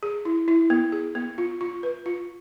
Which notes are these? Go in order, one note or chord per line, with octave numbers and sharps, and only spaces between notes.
G#4
E4
E4
B3
G#4
B3
F4
F4
B4
F4